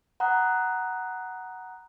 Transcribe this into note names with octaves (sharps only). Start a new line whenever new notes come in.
F#5 A#5 B5 D#6 F#6